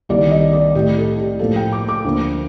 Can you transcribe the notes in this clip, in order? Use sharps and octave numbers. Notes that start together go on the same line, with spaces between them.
C2 C3 D#3 G3 A#3 D5
D#5
D5
A2 A3 G4
A4
G4
A2 F3 A#3 A4
G5
D6
D6
D2 D3 F3 A#3